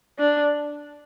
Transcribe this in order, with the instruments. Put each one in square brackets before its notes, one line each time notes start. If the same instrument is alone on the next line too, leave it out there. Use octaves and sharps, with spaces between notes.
[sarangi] D4